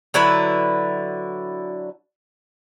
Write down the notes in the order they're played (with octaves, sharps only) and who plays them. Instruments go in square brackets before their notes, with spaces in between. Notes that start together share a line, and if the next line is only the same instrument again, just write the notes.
[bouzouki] D3 F#3 E4 B4